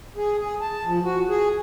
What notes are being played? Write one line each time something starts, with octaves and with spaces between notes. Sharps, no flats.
G#4
G#4
A5
F3
F#4
G#4